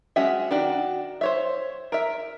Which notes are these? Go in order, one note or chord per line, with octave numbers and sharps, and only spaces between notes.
G#3 C#4 F#4 E5
D#3 D4 F#4
C5 C#5 E5
A#4 E5